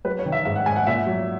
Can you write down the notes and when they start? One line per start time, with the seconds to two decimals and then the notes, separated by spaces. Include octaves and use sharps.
0.04 F#3 B4
0.19 C#5
0.26 D#3
0.32 E5
0.45 G#2 E5
0.56 F#5
0.66 G#2 G#5
0.76 F#5
0.87 A#2 E5
1.07 F#3